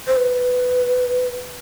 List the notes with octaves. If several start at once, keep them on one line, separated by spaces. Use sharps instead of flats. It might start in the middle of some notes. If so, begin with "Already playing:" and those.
C5
B4